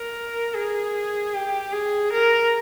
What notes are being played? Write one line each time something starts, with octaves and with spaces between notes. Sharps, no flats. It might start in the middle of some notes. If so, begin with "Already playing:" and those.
Already playing: A#4
G#4
G4
G#4
A#4